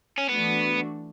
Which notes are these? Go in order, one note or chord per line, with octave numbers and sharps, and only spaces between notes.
C#4
E3 A3 B3 D4 F#4